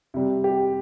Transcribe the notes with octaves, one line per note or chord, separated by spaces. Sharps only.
C3 G3
G4